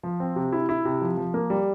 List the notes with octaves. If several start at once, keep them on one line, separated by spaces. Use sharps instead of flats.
F3
C4
C3
E4
E4
C3
F3
F3
A#3
G3